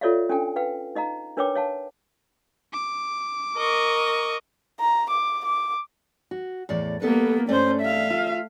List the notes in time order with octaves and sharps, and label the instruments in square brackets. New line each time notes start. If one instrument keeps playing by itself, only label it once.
[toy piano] F4 A4 C#5 D5 E5 F5
C#4 D4 A4 G5 G#5
B4 F5 G5
D#4 D#5 F5 A#5
D4 A#4 B4 C#5 G5 D6
C#5 F5 A5
[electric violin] D6
[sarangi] A#4 [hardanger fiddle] D#5 C#6
[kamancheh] A#5
D6
D6
[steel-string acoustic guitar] F#4
E2 A2 D5
[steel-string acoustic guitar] G3 A4 [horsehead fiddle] A#3 B3
[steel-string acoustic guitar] G2 A3 D5 [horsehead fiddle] C#4 C5
[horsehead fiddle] E5 F5
[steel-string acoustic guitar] F4